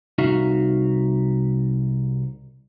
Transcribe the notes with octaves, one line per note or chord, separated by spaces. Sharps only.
C2 D#4 F#4 E5 F5